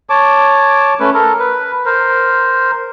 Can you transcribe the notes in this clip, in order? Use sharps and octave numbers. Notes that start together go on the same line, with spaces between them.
C#5 A5 D6
A3 C#4 B4
A4 A#4
B4
A#4 C5